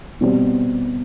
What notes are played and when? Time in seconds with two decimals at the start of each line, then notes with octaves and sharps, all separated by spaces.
0.21 B2 G3 C4